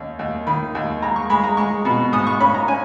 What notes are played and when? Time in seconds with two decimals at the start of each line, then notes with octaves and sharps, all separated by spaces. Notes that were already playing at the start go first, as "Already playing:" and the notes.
Already playing: D#2 C#4
0.19 D#2
0.47 D#3 B5
0.75 D#2
1.02 G#3 A#5
1.16 C#6
1.30 G#3 B5
1.44 A#5
1.57 G#3 C#6
1.85 B2
2.13 G#2 D#6
2.27 C#6
2.40 C#4 B5
2.54 A#5
2.68 C#4 G#5